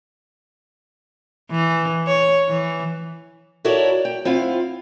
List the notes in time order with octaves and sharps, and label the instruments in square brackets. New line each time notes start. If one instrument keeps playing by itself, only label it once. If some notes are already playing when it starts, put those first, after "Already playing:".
[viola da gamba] E3
C#5
E3
[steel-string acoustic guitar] E4 F#4 A4 A#4 C#5 D5
G5
C4 E4 F4 F5 F#5